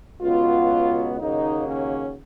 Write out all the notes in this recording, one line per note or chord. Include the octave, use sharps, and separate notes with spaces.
C#2 B2 F#3 B3 F4
D#2 C#3 F#3 A#3 D#4
C#4